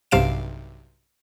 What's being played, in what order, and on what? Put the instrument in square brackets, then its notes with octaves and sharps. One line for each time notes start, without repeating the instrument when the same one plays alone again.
[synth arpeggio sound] B1 G2 C3 F5 D7 E7